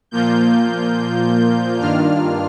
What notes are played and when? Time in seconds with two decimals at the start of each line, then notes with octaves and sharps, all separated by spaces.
0.11 A#2 F3 A#3 F4 G6
1.80 G2 D#3 A#3 D4 F4 F6